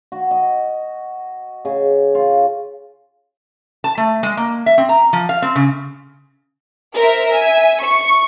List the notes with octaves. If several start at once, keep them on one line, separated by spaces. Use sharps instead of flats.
F#4
D#5
C#3
F4
A5
A3
G#3
A#3
E5
C4
A#5
F3
F5
C4
C#3
A#4 C5 E5
E5 G#5
C#6